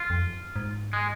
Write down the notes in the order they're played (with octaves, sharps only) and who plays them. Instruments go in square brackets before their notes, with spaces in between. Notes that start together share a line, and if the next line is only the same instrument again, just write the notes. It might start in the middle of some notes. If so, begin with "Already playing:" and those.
Already playing: [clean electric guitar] F4
[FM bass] F2
G#2
[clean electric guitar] G#3